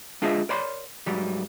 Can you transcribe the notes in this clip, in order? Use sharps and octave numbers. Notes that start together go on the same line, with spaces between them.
G#3 D4 F4 G#4 D#5 E5
A#4 C#5 D5 B5 C6
G#2 F#3 G3